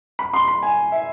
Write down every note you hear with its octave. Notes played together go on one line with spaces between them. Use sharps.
B5
C6
B5
G#5
E5